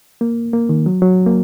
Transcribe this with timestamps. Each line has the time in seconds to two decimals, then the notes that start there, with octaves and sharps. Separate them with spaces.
0.21 A#3
0.53 A#3
0.69 D#3
0.86 F#3
1.02 F#3
1.26 A#3